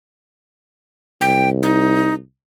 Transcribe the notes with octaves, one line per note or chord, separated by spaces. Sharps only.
C2 G5
D#4